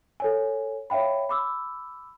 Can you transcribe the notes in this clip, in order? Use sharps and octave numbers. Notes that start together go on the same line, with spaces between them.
A4 C#5 G#5
C#5 E5 F5 G5 B5
B5 D6 E6